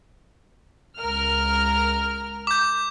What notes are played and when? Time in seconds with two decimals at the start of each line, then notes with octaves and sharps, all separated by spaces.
0.99 C#2 A#4 F6
2.47 D6 G6